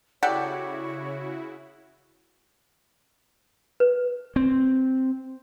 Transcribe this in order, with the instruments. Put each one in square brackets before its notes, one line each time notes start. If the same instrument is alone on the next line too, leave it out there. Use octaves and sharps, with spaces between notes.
[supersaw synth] C#3 E4 F#4 [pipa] G4 A4 D5 [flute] C#5 [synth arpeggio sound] F#5
[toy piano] B4
[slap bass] C4